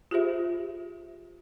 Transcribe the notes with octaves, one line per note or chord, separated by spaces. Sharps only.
F4 G4 G#4 C5 E5